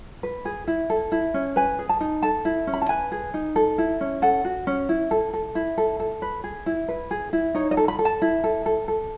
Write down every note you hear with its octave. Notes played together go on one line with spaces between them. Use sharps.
B4
G#4
E4
A4
E4
C#4
B4 G#5
G#4
A5
D#4
A4 A5
E4
C#4
B5
A5
B4 G#5
G#4
D#4
A4
E4
C#4
A4 F#5
F#4
C#4
E4
A4
A4
E4
A4
A4
B4
G#4
E4
B4
G#4
E4
D#4 C#5
D#5
A4
B5
A4
A5
E4
A4
A4
A4